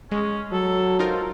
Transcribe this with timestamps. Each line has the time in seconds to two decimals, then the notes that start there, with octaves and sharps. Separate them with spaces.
0.12 G#3 C#4
0.52 F#3 A4
0.99 D#4 F4 A#4 C5